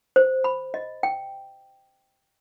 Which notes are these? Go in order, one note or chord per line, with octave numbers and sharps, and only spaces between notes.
C5
B5
D#5
G5